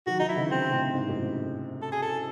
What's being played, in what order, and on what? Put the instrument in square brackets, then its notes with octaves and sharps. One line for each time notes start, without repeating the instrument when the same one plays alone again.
[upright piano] D#3 F#3 [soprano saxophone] F#4
[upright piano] D#3 F#3 [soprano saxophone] D#4
[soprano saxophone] E4
[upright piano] C#3 E3
[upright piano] C3 D#3 [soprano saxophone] C4
[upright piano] A2 C#3
G#2 C3
F#2 A2
G#2
[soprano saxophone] A4
G#4
A4